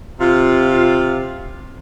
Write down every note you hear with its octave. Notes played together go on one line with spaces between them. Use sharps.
C3 F4